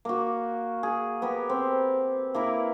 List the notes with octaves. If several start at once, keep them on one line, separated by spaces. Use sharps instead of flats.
A#3 F#4
G#4
B3 G4 A#4
C4
A#3 E4 A#4 B4